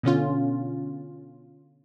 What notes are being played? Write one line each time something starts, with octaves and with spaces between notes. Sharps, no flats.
B2 D3 C#4 F4